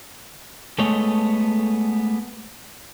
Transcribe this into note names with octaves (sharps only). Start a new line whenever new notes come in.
G#3 A3 B3 A4 C#5 D#5